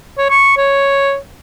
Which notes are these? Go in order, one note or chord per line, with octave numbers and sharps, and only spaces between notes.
C#5
C#6
C#5